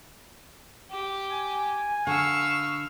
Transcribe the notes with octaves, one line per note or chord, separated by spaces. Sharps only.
G4
G#5
D3 F5 C#6 E6